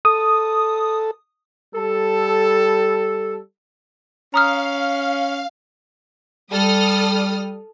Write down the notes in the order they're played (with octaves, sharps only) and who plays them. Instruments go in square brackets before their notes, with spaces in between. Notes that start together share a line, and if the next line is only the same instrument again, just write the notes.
[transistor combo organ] A4 [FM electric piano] D#6
[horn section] G3 A4
[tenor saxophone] C#4 [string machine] F5 [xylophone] A#5 D#6 F6
[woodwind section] G3 [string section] A4 D#6 F6